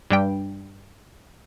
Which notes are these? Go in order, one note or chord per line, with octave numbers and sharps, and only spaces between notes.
G2 G3 G5